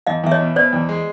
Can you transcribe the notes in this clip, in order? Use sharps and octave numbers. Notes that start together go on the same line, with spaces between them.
E2 D#5 F5
E2 E5
C#5 D#5
B2
B2 C5 D5
E2
G#3